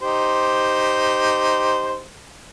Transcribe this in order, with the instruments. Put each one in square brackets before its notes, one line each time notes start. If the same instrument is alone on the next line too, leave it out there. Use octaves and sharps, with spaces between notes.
[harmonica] D#4 G4 C5